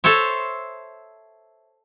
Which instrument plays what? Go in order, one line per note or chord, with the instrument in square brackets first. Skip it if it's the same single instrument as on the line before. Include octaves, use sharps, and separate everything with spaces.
[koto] A4 C5 C#5 E5